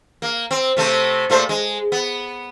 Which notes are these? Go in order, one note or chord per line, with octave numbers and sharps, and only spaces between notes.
A#3
C4
C3 A3 C4
A#2 A3 C5
G#3
B3